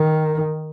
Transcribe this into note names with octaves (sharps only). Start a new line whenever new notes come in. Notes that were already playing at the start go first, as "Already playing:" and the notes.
Already playing: D#3